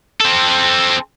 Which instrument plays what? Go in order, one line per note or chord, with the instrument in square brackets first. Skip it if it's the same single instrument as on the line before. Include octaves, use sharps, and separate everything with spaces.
[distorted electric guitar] C4 A4